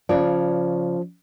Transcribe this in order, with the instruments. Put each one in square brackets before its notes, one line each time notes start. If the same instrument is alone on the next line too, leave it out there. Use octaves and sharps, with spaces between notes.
[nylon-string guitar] C#3 C#5 D5 [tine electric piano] F3